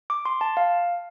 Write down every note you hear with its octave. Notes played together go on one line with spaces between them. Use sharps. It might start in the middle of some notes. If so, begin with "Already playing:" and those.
D6
C6
A5
F5